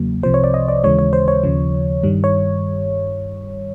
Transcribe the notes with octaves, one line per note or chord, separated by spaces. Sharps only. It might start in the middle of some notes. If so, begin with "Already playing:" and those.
Already playing: E2 C#3 F#3 A#3
C2 C3 F3 C5
C#5
D5
D#5
D5
D#2 C#3 E3 G#3 C#5
C#5
C5
C#5
D#2 C#3 F3
G2 D#3 G3
C#5